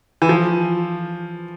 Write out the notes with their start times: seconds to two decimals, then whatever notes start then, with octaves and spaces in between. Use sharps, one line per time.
0.22 E3
0.29 F3